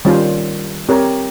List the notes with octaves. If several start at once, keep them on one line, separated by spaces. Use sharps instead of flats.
D#3 G3 C#4 F4 C5
C4 G4 A#4 C#5